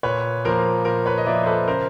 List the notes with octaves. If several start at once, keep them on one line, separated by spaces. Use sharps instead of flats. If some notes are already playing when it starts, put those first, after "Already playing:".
A#2 B4 C#5
F3 A#3 A#4 C5
A#2 A#4 C5
B4 C#5
D#5
F3 A#3 D5 E5
C5
A4 B4
C#3 A#4 C5